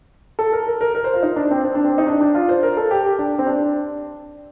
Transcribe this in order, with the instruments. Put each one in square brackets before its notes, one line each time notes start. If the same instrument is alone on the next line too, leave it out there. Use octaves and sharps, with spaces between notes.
[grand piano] A4
A#4
A#4
A#4
A#4
C5
F4
D#4
D4
C4
C4
D4
C4
D#4
D4
D4
F4
C5
A#4
A4
G4
G4
D4
C4
D4